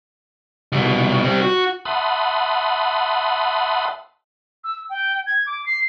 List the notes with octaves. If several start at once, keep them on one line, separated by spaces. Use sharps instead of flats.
C2 B2
G3 C4
F#4
E5 F#5 A5 B5 C6 D#6
E6
G5
G#6
D6
C7